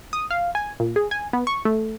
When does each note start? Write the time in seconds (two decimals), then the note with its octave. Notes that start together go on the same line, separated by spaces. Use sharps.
0.13 D#6
0.31 F5
0.55 G#5
0.80 A#2
0.96 G#4
1.11 G#5
1.33 B3
1.47 C#6
1.65 A3